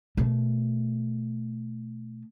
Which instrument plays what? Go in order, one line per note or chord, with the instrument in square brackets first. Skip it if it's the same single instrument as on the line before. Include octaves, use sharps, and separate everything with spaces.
[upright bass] B2 A3